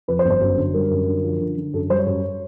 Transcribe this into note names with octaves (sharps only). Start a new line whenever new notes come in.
F2 B4
C5
G1
C5
F#2
D3
G3 A#4
F#2
D3
F3
D3
D3
F#2 A4
G3 C5
C#5
F#2